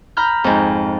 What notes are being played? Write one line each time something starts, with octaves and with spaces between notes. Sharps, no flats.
A#5 B5 F6 G6
F2 G#2